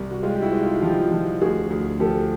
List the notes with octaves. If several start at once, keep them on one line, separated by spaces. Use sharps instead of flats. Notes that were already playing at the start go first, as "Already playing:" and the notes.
Already playing: C2
F#4
G#3 F4 G4
G4
E4 F#4
G#3
D#4 F4
F3 F4 G4
F3
D2 F#4 G#4
D2
F3 G4 A4